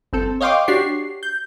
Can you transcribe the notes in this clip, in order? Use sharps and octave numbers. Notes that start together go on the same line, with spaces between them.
G1 C4 A4
C#5 D#5 F5 G5 C6 D6
D4 F#4 G4 C#5 C7
G6